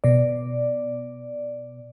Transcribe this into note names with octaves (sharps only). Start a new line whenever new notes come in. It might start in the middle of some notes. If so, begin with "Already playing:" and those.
B2 D5